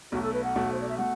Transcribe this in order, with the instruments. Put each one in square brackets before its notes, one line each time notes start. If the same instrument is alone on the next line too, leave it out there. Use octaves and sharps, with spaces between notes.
[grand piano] B1 B2 A3 [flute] F#4
[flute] A4
B4
F#5
[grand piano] B1 B2 A3
[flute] C5
D5
E5
[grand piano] B2 A3 [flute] F#5